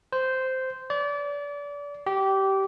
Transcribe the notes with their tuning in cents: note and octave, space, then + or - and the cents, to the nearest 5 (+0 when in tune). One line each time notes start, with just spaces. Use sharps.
C5 -10
D5 -30
G4 -20